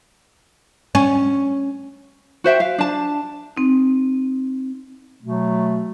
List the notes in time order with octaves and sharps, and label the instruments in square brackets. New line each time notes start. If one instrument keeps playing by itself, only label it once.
[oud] C#4
[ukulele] F#4 C5 E5 G5
F5
D4 A5
[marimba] C4 D#4
[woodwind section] B2 F#3 A3